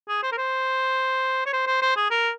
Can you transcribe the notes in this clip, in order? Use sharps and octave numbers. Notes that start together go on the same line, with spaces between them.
G#4
C5
A#4
C5
C#5
C5
C5
C5
G#4
A#4